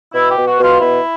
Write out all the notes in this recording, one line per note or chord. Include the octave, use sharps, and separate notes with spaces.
B2 E4
G4
B2
F#4
B2 F4
B2 E4